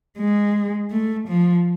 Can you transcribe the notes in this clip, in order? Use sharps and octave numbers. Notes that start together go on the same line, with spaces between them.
G#3
A3
F3